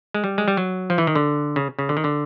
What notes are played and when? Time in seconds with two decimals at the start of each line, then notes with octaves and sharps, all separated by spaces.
0.14 G#3
0.24 G3
0.38 G#3
0.48 G3
0.57 F#3
0.90 F3
0.98 E3
1.07 D#3
1.15 D3
1.56 C#3
1.79 C#3
1.89 D3
1.97 D#3
2.04 D3